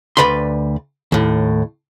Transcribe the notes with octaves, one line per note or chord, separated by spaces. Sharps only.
D2 A#2 B4 D5 B5 C6
D#2 A2